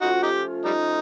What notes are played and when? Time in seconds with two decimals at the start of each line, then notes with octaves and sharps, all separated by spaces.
0.02 F3 A3 C#4 D#4 F4 F#4
0.23 D#4 G4
0.66 G3 D#4